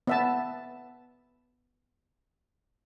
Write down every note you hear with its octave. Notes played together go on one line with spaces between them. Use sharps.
B3 E5 A5